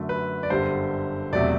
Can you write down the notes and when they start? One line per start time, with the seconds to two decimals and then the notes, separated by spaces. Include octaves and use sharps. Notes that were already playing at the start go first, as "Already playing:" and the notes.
Already playing: F#2 D3 F#3 A3
0.09 B4
0.43 D5
0.50 G1 F#2 D3 G3 C5
1.32 E1 E2 C3 F#3 A3 D5